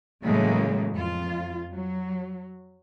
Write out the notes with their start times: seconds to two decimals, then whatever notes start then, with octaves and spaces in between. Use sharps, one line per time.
0.24 A2 C#3 E3 F#3 G#3 A#3
0.92 F2 F4
1.73 F#3